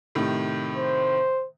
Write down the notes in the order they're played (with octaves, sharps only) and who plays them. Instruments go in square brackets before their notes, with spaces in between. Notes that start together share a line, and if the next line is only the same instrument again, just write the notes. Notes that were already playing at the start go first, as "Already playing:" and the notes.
[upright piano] A2 C3 D#3
[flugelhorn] C5